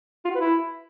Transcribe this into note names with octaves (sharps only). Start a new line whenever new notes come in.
F4
F#4
B4
E4